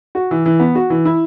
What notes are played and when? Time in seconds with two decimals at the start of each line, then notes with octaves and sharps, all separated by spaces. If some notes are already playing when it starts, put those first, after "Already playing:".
0.15 F#4
0.31 E3
0.46 E3
0.60 B3
0.75 F#4
0.90 E3
1.05 E4